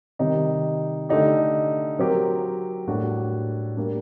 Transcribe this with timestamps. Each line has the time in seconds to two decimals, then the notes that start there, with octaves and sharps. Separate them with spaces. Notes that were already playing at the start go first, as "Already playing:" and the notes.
0.19 C3 D#3 G3 C4 D#4
1.09 D3 A3 D#4 G4
1.99 F#3 C4 G4 A#4
2.88 A2 G3 A#3 D4 F#4
3.77 G3 A#3 D4